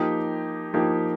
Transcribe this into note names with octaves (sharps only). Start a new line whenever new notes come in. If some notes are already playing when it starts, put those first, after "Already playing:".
Already playing: F3 A#3 D#4 G4
F3 A#3 D#4 G4